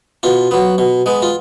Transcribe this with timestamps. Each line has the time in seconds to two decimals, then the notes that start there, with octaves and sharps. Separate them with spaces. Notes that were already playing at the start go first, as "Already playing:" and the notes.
0.23 B2 F4
0.51 F#3 B3
0.78 B2
1.06 G#3 B3
1.22 F4